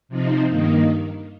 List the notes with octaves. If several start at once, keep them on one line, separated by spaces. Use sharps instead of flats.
C3 F3 C4 D#4
G2 D#3 A#3 D#4